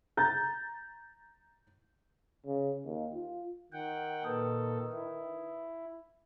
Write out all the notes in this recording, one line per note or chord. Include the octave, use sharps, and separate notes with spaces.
A#5 G6 A6
C#3
D#2
F4
D#3 F#5 G5
A#2 A4 B4 D#6
E4